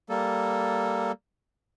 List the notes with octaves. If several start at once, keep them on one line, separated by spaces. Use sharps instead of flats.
G3 A#3 A4